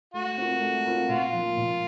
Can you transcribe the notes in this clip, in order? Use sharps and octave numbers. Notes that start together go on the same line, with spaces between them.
A3 F#4
C4 F4 A#4
A3
C4 F4 A#4
A#2 F4
F3 A#3
A#2